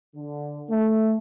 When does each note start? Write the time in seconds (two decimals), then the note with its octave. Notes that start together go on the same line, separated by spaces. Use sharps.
0.16 D3
0.70 A3